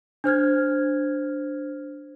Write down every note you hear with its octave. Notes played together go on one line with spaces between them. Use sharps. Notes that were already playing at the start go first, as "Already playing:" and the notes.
D4 C5 F6 G#6